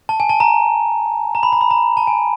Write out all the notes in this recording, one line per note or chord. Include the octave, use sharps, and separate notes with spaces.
A5
G#5
A5
A#5
A#5
B5
A#5
B5
A#5
A5
G#5